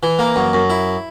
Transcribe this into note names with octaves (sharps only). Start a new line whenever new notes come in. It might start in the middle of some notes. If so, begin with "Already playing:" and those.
E3
A#3
F#2
F#2
E4